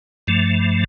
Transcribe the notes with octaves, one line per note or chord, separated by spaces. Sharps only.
G2 F3 A3